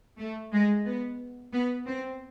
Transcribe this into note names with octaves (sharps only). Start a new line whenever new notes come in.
A3
G#3
B3
B3
C4